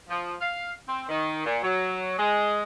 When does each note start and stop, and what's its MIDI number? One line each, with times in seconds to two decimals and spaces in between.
0.09 0.35 53
0.41 0.72 77
0.88 1.05 60
1.09 1.43 51
1.46 1.58 46
1.63 2.18 54
2.18 2.62 56